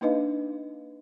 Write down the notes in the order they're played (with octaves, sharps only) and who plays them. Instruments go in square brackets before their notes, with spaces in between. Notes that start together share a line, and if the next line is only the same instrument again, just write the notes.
[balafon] A#3 D4 D#4 B4 D#5 F5